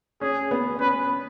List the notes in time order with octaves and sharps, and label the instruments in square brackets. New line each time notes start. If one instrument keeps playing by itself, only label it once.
[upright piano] C#4 [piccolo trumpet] G#4
[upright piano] B3
[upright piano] C#4 [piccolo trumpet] B4